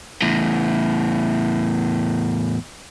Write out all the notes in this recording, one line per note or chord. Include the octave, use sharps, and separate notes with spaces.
E2 A2